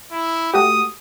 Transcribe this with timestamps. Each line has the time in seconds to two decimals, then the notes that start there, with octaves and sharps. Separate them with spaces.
0.12 E4
0.54 A3 F#4 G4 D#6